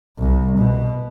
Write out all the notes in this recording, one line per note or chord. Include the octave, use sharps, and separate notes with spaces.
C2
B2